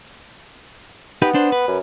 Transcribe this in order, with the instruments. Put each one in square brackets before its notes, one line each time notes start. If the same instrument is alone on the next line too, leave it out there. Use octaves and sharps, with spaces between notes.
[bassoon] B3 [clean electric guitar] D#4 G4 B4
[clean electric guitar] D4 C5
B4
[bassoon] F#2